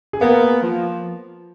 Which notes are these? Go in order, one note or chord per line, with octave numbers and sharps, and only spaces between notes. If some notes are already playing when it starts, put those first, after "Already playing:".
G#4
A#3 B3 A#4
F3